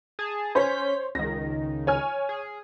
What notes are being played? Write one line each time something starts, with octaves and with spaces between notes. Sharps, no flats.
G#4 A5
C#4 C5 C#5 G6 B6
C#2 D#3 A#6
C#5 G#5 F6
G#4